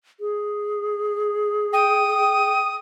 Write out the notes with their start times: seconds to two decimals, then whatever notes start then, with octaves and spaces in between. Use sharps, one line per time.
0.20 G#4
1.73 G5 D#6